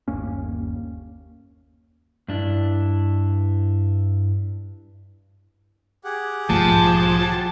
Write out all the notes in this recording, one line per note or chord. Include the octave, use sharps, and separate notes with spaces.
G1 D#2 A#3 C#4
G2 D4 E4
G4 G#4 F#5
B1 G#2 F3 A5